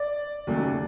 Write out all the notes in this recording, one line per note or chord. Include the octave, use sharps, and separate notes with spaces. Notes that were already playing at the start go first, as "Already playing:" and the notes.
Already playing: D5
D#2 C#3 F#3 A3